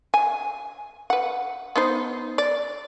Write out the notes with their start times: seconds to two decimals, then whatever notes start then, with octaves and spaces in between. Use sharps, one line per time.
0.14 G#5
1.10 B4 F#5
1.76 B3 D#4 C5
2.38 D5